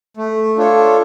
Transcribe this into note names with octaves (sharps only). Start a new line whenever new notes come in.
A3
D4 F4 A4 C#5